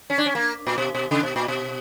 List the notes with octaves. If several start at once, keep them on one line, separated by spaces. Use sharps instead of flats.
C#4
D4
C#4
A#3
A#2
B2
B2
C#3
B2
A#2
B2